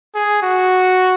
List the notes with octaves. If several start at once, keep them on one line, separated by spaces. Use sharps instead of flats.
G#4
F#4